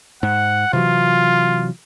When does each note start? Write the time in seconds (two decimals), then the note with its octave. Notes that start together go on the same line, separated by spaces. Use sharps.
0.23 G#2 F#5
0.73 C3 E3 F#3 F4